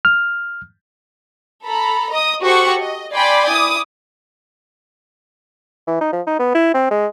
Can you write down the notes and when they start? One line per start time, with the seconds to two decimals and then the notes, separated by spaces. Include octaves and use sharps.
0.05 F6
1.65 A4 A#5 B5
2.12 D#5 D#6
2.43 F#4 G4 A4 C5 F#5 C#6
2.79 D#5
3.12 D5 G5 G#5 B5 C6
3.48 E4 D6 D#6
5.87 E3
6.01 D#4
6.12 F3
6.27 D#4
6.39 B3
6.54 E4
6.74 C4
6.91 G#3